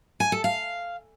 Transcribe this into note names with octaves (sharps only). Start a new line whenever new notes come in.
G#5
A4
F5